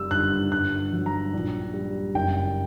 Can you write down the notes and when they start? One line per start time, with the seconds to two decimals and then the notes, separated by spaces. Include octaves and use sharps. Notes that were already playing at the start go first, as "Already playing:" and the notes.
Already playing: F#1 G3 E6
0.10 G1 F#6
0.52 G1 F#6
0.93 F#3
1.06 A#5
1.33 A#1
1.74 G3
2.14 F#1 G5